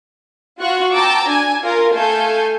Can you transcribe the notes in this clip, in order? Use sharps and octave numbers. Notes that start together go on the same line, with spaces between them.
F4 F#4 C#6 F#6
G5 A5 A#5 D6 E6
D4 G#5
F4 A#4 F5
A3 A4 F5 G#5 G6